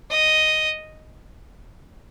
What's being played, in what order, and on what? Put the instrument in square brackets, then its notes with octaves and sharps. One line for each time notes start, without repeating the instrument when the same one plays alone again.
[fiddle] D#5